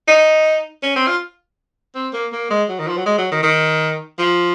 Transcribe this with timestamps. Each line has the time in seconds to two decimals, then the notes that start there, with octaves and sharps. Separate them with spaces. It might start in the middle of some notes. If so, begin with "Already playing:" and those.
0.08 D#4
0.83 C#4
0.96 C4
1.07 F4
1.95 C4
2.13 A#3
2.32 A#3
2.50 G#3
2.69 F#3
2.79 D#3
2.88 F3
2.97 F#3
3.06 G#3
3.18 F#3
3.31 D#3
3.43 D#3
4.19 F3